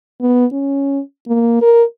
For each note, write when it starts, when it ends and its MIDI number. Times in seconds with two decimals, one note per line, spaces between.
0.21 0.46 59
0.52 1.01 61
1.28 1.60 58
1.61 1.83 70